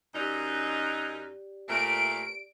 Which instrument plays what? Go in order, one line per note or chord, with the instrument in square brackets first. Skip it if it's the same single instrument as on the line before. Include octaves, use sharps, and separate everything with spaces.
[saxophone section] F#2 D#4 [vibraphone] G4 D5
[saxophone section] A#2 A3 [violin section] D7